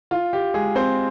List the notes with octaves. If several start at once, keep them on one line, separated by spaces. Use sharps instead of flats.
F4
G4
G#3 G#4
C4 C5